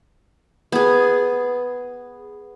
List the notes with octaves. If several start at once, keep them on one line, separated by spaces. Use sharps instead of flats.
B3 G#4